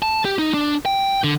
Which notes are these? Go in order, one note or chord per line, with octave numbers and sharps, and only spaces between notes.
A5
G4
D#4
D4
G5
D3